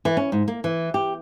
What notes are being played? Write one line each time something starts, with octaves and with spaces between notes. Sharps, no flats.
E3
C#4
G#2
A#3
E3
G4